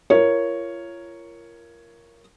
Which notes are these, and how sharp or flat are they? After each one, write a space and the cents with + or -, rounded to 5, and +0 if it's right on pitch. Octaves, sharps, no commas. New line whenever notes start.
F4 -35 A#4 +0 C#5 +0